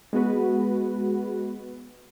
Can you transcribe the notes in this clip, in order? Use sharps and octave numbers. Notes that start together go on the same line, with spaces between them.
G#3 B3 F#4 B4